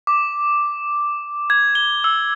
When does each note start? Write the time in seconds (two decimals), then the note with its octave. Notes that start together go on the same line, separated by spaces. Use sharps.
0.07 D6
1.50 G#6
1.75 G7
2.04 E6